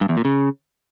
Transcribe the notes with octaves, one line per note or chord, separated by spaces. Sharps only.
G2
E2
A#2
C#3